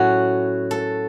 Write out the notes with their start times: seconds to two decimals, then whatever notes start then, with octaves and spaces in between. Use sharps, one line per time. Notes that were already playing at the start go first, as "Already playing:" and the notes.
Already playing: A2 F#3 C#4 F#4
0.71 A4